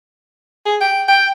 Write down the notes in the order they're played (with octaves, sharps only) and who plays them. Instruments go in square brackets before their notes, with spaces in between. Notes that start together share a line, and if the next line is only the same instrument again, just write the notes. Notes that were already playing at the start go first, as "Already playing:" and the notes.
[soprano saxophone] G#4
G5
G5